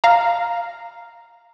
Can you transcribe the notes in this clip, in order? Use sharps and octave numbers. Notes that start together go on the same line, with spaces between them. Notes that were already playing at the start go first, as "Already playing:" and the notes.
F5 A#5